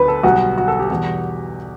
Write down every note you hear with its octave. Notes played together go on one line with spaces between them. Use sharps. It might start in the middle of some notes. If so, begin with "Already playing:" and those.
Already playing: D2 D3 F#3 B3 B4
A4
B1 B2 G3 B3 F#4
F#4
A4
G4
E2 B2 G3